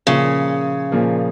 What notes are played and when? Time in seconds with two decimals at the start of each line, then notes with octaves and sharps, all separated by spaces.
0.07 A#2 C#3 F3 A#3 F4 G#4
0.92 A#2 F3 A#3 F4 G#4